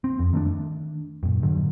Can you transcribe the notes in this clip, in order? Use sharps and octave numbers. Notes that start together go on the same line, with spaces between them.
C4
F2
D#3 A3 D4
F#2 A#2
A2 D3 F#3